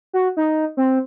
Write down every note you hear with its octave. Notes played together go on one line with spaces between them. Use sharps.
F#4
D#4
C4